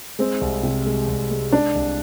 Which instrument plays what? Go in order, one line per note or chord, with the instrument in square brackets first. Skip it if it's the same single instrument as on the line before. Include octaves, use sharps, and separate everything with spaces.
[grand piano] G#3 [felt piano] C4
[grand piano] C2
C3
G#3
C2
G#3
[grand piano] G#3 [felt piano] D4
[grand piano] C2